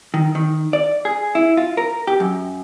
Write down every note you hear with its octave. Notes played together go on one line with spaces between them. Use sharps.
D#3
D#3
D5
G#4
E4
F4
A#4
G4
F#2